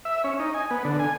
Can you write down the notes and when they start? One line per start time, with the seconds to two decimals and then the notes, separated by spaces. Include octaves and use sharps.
0.05 E5
0.24 C#4
0.40 D#4
0.54 G#5
0.71 B3
0.85 D3
0.99 G#5